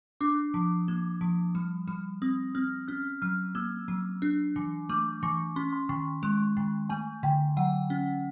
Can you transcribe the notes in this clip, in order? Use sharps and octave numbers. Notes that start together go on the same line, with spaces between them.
D4 D6
F3
A#3
F3
G3
G3
C4 D#6
C4 F6
C#4 F6
F#3 F6
A#3 E6
F#3
D4
E3
A3 D6
E3 C#6
C#4 C6
C6
D#3 C#6
G#3
D#3
A3 G#5
D3 G5
F#3 F#5
C#4